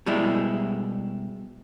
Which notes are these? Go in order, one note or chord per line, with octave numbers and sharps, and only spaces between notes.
B2 G3 G#3 E4